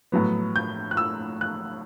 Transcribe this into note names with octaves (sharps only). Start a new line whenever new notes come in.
A2 F#3 B3
G6
F#6
E6
F#6